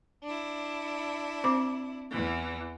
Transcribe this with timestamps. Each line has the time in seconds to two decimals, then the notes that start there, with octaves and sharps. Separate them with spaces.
0.24 D4 E4
1.44 C4 C5 D6
2.09 E2 E3